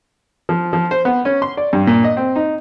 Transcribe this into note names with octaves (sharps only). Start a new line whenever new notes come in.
F3
F3
C5
B3
C#4
C6
D5
G2
A#2
D#5
C4
D#4